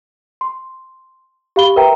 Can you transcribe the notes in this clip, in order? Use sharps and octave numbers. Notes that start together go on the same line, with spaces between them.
C6
G4 F5 B5 G7
A#4 B4 E5 G5 A#5